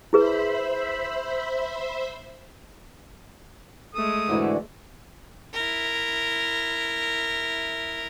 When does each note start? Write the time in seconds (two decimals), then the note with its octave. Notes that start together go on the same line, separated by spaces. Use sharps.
0.13 E4 G#4 B4 C5 E5 B5
3.95 G#3 A3 D#6
4.29 G#2 D3 E3 E4 F#4 D5
5.54 E4 A#4